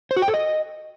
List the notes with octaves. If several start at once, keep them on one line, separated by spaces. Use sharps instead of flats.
C5
F#4
G5
A4
D#5